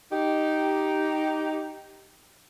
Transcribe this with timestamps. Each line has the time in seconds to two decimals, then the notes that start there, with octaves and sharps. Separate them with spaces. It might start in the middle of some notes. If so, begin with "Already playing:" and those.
0.11 D#4 G4